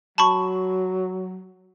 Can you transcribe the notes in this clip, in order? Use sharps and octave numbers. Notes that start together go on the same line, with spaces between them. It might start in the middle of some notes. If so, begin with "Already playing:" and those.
F#3 A5 B5 C#6